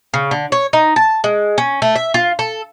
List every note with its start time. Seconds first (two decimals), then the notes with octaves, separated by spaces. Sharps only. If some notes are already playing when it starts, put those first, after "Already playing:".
0.14 C#3
0.31 D3
0.52 C#5
0.73 D#4
0.96 A5
1.24 G#3
1.58 C#4
1.82 A3
1.95 E5
2.14 F4
2.39 A4